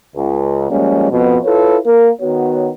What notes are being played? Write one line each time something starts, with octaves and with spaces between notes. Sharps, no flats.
C#2
F3 G3 G#3 A#3 C#4
F2 B2
E4 F4 A4 B4 C#5
A#3 A#4
D#3 B3 F#4 C#5